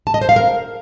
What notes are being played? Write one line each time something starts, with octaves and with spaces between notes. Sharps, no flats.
A5
D#5
C5
F5
A#4